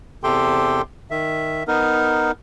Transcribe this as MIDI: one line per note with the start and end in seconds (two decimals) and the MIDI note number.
0.24 0.82 40
0.24 0.82 48
0.24 0.82 67
0.24 0.82 69
0.24 0.82 79
0.24 0.82 84
1.11 1.64 51
1.11 1.64 76
1.68 2.32 59
1.68 2.32 63
1.68 2.32 70